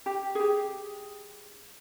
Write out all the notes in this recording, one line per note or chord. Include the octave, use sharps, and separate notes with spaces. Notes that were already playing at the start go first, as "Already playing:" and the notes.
G4
G4 G#4